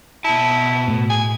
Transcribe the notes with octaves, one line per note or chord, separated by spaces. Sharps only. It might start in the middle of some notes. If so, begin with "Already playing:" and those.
B2 E4 A5
A2
G#5